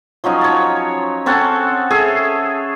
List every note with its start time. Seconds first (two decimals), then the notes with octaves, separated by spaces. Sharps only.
0.24 F3 F#3 C#4 D#4
0.41 C#5 A5
1.26 C4 C#4 A4 F#5
1.91 G#4 A4 C#5 E5